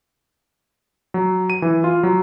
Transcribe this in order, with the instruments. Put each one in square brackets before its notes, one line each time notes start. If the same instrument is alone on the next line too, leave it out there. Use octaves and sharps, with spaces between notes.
[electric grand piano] F#3
D#7
E3
F4
F#3